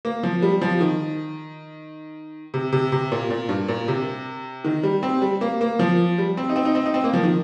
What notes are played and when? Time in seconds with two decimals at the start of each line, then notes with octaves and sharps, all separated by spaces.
0.05 A#3
0.23 F3
0.42 G3
0.62 F3
0.81 D#3
2.54 C3
2.72 C3
2.92 C3
3.12 A#2
3.30 A#2
3.49 G2
3.68 A#2
3.88 C3
4.64 D#3
4.83 G3
5.03 C4
5.22 G3
5.41 A#3
5.61 A#3
5.79 F3
6.18 G3
6.37 C4
6.49 D#4
6.56 C4
6.65 D#4
6.75 C4
6.86 D#4
6.94 C4
7.04 A#3
7.13 F3
7.23 D#3